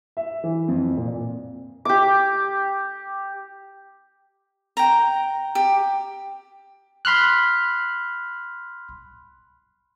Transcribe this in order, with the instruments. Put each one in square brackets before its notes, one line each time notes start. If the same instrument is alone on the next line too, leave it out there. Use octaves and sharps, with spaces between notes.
[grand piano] E5
E3
F2
A#2
[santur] G4 D6
[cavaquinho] G5 A#5
G4
[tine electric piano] B5 C6 F6 F#6